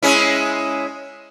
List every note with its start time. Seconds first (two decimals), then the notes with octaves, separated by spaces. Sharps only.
0.03 G#3 C#4 E4